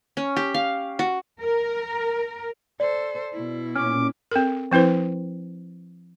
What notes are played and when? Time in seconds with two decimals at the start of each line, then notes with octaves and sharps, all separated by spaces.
0.17 C#4
0.36 G4
0.54 F5
0.99 F#4
1.41 A#4
2.80 A4 C5 D5
3.33 B2 E4
3.76 A#2 C#4 D6 F6
4.31 C4 A4 A#4
4.71 F3 C4 E4 B4 C5